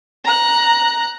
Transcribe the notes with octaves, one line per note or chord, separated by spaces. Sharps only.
A#5 F#6